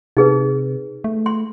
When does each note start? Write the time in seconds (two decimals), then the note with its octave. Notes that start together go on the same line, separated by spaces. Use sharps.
0.17 C3 D#4 G#4 B4
1.04 A3
1.26 C6